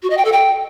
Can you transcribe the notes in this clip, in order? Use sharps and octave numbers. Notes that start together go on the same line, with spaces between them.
F#4
D#5
G5
A4
G5